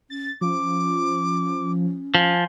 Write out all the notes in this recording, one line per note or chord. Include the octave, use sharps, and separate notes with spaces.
C#4 A6
F3 C#4 D6
F3 G#5